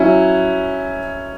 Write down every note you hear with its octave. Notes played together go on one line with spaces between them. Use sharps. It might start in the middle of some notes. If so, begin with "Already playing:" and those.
Already playing: F#3 C#4 E4